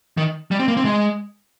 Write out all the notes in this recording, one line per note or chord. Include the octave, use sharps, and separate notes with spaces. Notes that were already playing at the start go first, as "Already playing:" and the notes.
D#3
G3
C4
A#3
C4
G#3